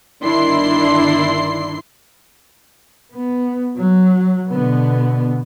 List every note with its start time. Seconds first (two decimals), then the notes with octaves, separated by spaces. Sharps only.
0.23 G1 D#3 D4 E4 C6 C7
3.12 B3
3.75 F#3
4.50 B2 D3 B3